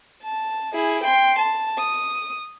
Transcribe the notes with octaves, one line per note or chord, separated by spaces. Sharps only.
A5
E4 G#4
G5 C6
A5
D#6